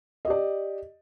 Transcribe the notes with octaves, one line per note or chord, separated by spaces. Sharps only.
G4 D5 D#5